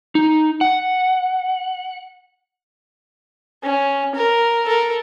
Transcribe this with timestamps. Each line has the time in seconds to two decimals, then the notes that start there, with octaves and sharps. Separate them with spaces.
0.15 D#4
0.61 F#5
3.63 C#4
4.15 A#4
4.65 A4 A#4